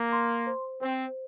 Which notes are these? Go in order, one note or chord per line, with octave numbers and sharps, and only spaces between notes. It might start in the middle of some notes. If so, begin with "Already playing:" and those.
Already playing: A#3
C6
C5
C4 C5